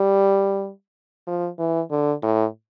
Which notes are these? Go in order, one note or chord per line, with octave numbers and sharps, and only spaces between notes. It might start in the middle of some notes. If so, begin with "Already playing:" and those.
Already playing: G3
F3
E3
D3
A2